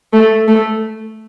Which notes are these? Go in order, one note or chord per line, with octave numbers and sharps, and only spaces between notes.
A3
A3